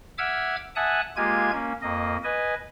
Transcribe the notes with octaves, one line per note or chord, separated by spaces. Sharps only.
E5 F#5 D6 E6 F6 G#6
E5 F#5 G#5 A5 D#6 F#6
G#3 A#3 F4 G4 G#5 G#6
A#3 C#4
F2 A#3 D#5
B4 D#5 G#5